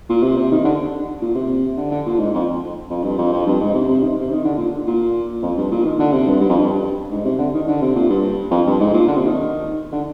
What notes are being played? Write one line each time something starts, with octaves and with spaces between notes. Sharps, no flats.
A#2
C3
C3
D#3
D3
A#2
C3
D3
D3
A#2
G#2
F2
F2
G2
F2
F2
G2
G#2
C3
C3
D#3
C3
D#3
D3
A#2
A#2
F2
G2
A#2
D#3
D3
C3
G2
G2
F2
G2
G#2
C3
D3
D#3
D3
C3
A#2
G2
F2
G2
G#2
A#2
D3
C3
D#3
D3